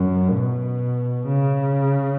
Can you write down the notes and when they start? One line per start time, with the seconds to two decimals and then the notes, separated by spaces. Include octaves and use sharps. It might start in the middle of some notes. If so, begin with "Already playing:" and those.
Already playing: F#2
0.31 B2
1.28 C#3